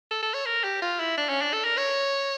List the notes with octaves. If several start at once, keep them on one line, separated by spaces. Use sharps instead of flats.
A4
A4
C#5
A#4
G4
F4
E4
D4
C#4
D4
A4
A#4
C#5